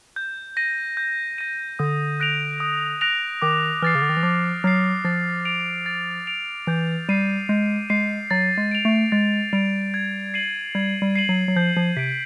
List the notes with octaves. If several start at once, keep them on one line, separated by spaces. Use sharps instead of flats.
G6
A#6 D#7
G6
A#6 D#7
D3 D#6
F#6 A#6 D7 F7
D#6
F#6 A#6 D7 F7
D#3 D6
E3 F6 A6 C7
C#3
D3
D#3
E3
F3 D6
F#3 F6 A6 C7
F3 A6
D7 F7
A6
D7 F7
E3 G6
G3 C7 D#7
G#3 G6
G#3 C7 D#7
F#3 A6
G#3
D7 F7
A3
G#3 A6
G3 D7 F7
G#6
C7 D#7 F#7
G3 G#6
G3
C7 D#7 F#7
F#3
F#3
F3 G6
F3
C3 B6 D7